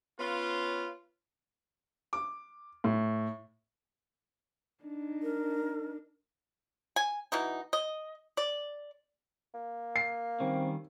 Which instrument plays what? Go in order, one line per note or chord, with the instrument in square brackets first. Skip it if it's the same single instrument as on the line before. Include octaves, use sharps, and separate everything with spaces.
[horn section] B3 C#4 F4
[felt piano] D6
A2
[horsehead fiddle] D4 D#4
[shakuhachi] A#4
[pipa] G#5
B2 E3 D#4
D#5
D5
[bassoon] A#3
[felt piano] C7
[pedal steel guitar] D#3 G3 C#4 [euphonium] C4